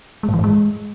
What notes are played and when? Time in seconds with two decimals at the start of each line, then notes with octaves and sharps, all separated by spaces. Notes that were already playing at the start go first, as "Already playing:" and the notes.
0.23 G#3
0.28 A2
0.34 E3
0.39 G#2
0.44 G#3